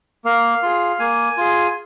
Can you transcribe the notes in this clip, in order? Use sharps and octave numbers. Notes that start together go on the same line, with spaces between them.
A#3 F5
F4 G#4
A#3 G#5
F4 G#4